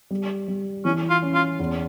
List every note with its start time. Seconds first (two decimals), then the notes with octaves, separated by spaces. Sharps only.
0.11 G3
0.48 G3
0.85 E3 C#4
1.10 F4
1.22 C#4
1.35 F4
1.60 E2